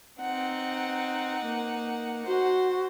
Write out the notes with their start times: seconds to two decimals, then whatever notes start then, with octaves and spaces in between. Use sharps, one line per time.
0.20 C4 D#4 F#5
1.45 A#3
2.27 F#4 C5